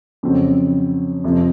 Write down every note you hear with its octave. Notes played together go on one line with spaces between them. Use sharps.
F2 C#3 F#3 C4
F2 C3 F3